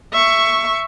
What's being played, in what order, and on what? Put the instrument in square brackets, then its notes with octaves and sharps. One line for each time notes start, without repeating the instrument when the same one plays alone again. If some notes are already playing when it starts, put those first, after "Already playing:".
[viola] E5 C#6